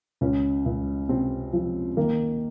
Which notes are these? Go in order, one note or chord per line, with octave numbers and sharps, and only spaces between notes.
C#2 C#4
C#2
C3 C4
F3
D#3 A#3